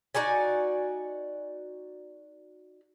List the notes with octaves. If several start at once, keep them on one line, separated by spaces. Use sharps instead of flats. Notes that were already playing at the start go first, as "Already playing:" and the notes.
D#4 F#4 D5 G#5